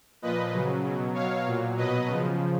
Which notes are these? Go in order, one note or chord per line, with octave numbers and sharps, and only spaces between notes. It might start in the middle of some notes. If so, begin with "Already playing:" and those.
A#2 F3 B4 D#5
C#3 F#3
B2 F#3
B2 F#3 C#5 F5
A#2 F#3
B2 F#3 B4 D#5
C#3 F3